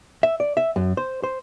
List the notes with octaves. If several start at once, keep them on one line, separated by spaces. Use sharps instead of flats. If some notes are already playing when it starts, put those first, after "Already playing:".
E5
D5
E5
F#2
C5
C5